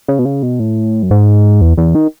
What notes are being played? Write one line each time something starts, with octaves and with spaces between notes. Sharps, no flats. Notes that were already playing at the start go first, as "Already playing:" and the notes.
C#3
B2
C#3
B2
A2
F#2
G#2
E2
E2
D#3